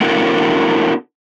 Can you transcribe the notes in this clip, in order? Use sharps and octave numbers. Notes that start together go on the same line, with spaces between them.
B3 D4 E4 F#4 A4 A#4